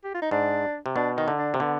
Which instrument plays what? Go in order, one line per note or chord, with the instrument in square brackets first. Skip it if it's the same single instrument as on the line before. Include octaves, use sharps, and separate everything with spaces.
[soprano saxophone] G4
F4
D#4
[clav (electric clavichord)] G#2 [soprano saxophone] D4
[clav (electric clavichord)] C3
[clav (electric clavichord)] B2 [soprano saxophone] D4
[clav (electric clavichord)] D#3 [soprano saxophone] D#4
[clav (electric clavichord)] D3
[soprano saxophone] D4
[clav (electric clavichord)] C3
[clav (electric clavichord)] D3 [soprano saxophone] B3